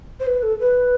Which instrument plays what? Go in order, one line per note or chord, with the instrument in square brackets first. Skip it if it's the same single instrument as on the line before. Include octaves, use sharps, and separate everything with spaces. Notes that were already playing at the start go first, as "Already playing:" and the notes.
[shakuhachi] C5
B4
A4
B4